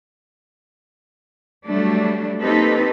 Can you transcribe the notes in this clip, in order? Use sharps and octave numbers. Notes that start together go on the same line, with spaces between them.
F#3 G3 A3 D4
A#3 C4 D#4 G4 A4 B4